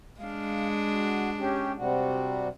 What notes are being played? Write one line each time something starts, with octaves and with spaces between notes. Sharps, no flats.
G#3 D4 F5
F#4
C#4 G4
C3 G3 F#4